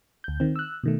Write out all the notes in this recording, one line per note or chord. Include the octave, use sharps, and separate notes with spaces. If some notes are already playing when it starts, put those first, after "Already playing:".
D2 G6
D#3 C4
E6 F#6
B2 D#3 A3